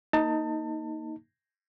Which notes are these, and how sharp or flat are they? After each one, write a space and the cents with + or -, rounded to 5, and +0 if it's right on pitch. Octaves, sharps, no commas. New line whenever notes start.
A#3 +0 D#4 +10 A5 +30